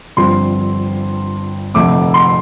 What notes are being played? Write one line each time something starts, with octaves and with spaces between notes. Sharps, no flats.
G1 G2 F3 C4 C6
F1 F2 D3 A3 D6
C6